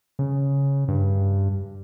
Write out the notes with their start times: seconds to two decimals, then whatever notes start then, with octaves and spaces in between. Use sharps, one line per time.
0.19 C#3
0.88 G2